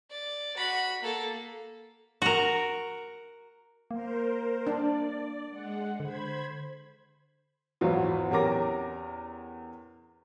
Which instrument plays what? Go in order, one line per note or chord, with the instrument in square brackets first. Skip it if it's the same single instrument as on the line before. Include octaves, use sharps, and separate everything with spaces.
[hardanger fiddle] D5
F#4 B5
A#3 A4
[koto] F#4 A#4
[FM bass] A#3 [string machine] A#4 C5
[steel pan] D4 [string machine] D5
[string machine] G#3 F#5
[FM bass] D3 [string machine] C5 B5 G#6
[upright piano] G#1 E2 E3 F#3 B3 F4
E2 C#4 G4 A#4 D6 A#6